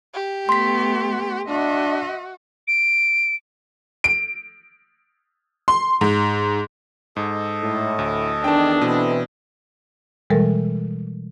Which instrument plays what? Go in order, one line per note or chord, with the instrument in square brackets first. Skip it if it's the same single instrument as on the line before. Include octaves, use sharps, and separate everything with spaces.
[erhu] G4
[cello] A3 B3 [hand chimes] C6 B6
[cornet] D4 [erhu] F#4 [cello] D#5 E5
[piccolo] D7
[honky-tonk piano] D7
C6
G#2
[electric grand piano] G#2 [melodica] A4 D#5
[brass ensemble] A2
[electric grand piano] D2
[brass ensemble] E2 D#3 [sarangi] D4 [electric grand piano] G5 A5
[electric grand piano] B2 [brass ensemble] E3 C4 E4
[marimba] B2 E3 G3 G#3 A4 A#4